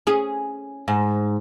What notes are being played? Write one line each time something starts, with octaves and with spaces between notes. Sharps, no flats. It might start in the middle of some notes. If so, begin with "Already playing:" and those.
C#4 G#4
G#2